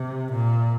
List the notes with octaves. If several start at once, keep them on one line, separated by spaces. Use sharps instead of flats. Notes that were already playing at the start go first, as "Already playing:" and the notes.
Already playing: C3
A#2